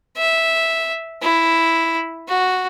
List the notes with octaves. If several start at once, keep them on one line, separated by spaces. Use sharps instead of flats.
E5
E4
F#4